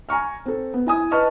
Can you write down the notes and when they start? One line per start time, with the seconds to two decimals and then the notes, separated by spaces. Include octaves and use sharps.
0.09 G#5 A#5 C#6 F6
0.46 C4 A4
0.74 B3
0.87 E4 G#5 D#6
1.11 B4 D#5 A5 C#6 F6